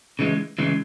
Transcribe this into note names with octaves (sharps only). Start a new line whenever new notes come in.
C#3 E3 G#3
C#3 E3 G#3